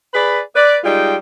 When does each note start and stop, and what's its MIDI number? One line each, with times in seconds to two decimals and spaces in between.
0.14 0.40 68
0.14 0.40 71
0.14 0.40 74
0.14 0.40 83
0.55 0.76 71
0.55 0.76 74
0.84 1.16 55
0.84 1.16 56
0.84 1.16 63
0.84 1.16 65
0.84 1.16 79